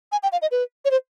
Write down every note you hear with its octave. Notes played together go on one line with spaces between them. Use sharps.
G#5
G5
F5
D#5
B4
C#5
C5